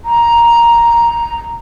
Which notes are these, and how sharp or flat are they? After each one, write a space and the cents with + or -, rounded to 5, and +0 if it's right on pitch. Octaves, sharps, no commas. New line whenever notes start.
A#5 +5